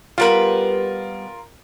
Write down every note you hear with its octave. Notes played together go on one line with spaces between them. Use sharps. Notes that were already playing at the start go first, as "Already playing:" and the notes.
G3 B3 F4 A#4 B4